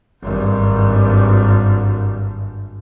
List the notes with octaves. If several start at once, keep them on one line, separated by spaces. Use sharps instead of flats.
G#1 G2